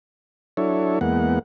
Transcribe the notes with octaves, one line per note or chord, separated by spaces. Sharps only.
F#3 D4 E4 A4 C#5
E2 G#3 A#3 B3 F#5